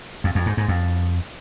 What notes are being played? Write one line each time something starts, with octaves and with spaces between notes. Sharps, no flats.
F2
F2
G#2
G#2
F2